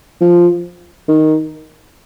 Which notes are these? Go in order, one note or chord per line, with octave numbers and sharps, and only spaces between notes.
F3
D#3